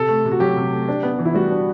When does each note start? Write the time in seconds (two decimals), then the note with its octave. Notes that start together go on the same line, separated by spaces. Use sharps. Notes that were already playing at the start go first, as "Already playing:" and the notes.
Already playing: C3 A4
0.08 A3
0.25 C3
0.32 F#4
0.40 F#3 G4
0.57 C3
0.73 A3
0.88 D4
1.03 B3
1.19 E3
1.25 E4
1.34 G3 F#4
1.51 D4